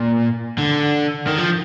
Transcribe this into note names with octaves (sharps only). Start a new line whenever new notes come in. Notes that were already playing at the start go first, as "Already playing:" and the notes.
Already playing: A#2
D3
D#3
F3